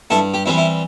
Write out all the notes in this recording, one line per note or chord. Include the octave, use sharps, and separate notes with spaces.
G2 E4 A4
G4
E3 G3 C4 E4
E4